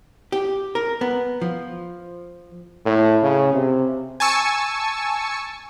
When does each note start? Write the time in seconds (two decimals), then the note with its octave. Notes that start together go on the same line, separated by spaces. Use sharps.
0.32 G4
0.75 A#4
1.01 B3
1.41 F3
2.85 A2
3.23 C#3
3.53 C3
4.20 G#5 A5 C#6 E6 C#7